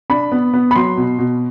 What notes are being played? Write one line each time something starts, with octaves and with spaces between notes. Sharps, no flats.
D4 B5
B3
B3
B5
F#3 C6
B2
B2